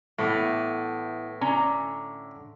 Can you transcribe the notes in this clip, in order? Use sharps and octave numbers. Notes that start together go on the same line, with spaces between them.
A2 E3 A3 B3
D3 C#4 A#5